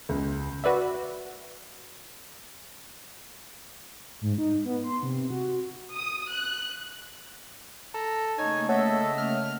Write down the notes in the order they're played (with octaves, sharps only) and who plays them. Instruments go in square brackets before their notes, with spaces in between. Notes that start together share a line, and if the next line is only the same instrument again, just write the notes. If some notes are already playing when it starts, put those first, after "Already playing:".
[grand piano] C#2
[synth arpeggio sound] F#4 B4 D5 E5
[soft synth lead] G#2
D#4
B3
C6
C3
F#4
[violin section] D#6
F#6
[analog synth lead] A4 [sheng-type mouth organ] A#5
[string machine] C#3 A3 A#3 [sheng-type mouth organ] D#4 C#5 [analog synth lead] G#5
[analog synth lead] A4 [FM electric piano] C#5 F#5 [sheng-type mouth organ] D#5 E5
[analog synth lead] F6